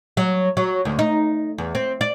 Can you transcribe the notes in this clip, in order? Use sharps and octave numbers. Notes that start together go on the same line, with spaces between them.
F#3
F#3
D2
D#4
E2
C4
D5